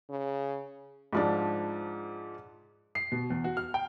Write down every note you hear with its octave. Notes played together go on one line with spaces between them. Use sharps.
C#3
G#2 F3 D4
C7
B2
E2
F#4
F6
G5